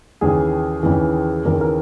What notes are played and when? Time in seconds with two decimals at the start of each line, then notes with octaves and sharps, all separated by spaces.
0.21 D#2 C#3 E3 G#4
0.83 D#2 C#3 E3
1.45 D#2 C#3 E3 A#4
1.61 A#4